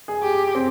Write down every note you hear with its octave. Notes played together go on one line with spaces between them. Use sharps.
G#4
G4
C4